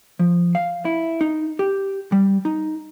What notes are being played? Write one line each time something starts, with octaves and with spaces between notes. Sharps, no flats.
F3
F5
E4
D#4
G4
G3
D#4